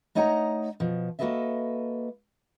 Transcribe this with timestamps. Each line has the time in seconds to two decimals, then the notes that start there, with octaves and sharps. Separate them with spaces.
0.15 A3 D#4 C#5 D#5 F#5 A#5
0.80 B2 F3
1.19 A#3 F#4 A4 B4 D#5 E5